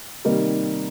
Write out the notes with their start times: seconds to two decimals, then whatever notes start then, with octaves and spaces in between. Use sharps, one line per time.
0.25 C3 D#3 G3 A#3 D#4